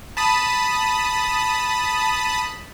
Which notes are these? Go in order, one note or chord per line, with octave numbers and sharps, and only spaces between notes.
A5 B5 D#6